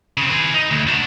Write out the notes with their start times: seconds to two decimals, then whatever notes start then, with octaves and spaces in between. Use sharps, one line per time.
0.17 C#3 C4
0.29 G#4 B4
0.54 D#4
0.71 D2
0.87 D4 F#4